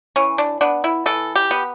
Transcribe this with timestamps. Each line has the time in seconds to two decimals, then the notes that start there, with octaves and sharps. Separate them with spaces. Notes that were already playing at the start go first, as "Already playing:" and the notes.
0.16 E3 C#4
0.38 D4
0.61 B3 D4
0.84 E4
1.06 E3 A4
1.35 G4
1.51 B3